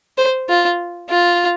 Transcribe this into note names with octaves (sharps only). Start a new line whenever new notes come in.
C5
F4
F4